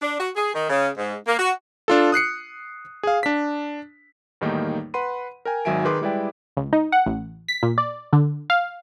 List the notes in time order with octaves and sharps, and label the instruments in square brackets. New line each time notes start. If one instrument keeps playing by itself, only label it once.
[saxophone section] D4
F#4
G#4
D#3
C#3
G#2
A#3
F#4
[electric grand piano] D4 F4 A4
D#6 F#6 C7 C#7
G#4 F5
D4 B6
E2 A2 D#3 G3 A#3 D#4
B4 F#5 B5 C6 D#7
A#4 G5 G#5
G#1 D#3 F#3 E5 G#5 D7
D#3 G#4 B4 C6 D6
G3 G#3 E4 B4 D5 G5
[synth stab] C#2
D#4
F#5
A1
B6
A#2
D5
D3
F5